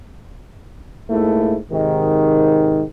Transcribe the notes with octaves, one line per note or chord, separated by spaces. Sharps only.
G#2 A3 A#3 E4
G#2 C3 D#3